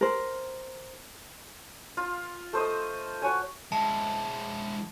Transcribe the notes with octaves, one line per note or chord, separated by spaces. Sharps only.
A#4 C5
F4
A3 C5 D#5
F#4 C#5 G#5
G#3 E4 A5